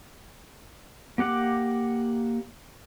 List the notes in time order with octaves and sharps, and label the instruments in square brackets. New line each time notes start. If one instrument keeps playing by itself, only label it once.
[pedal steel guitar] A#3 G4 F#5 D6